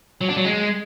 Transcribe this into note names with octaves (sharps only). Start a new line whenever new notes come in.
F#3
D4
F#3
G#3